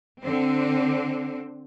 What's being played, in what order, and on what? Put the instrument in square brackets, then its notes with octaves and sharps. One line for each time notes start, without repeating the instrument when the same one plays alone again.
[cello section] D3 C4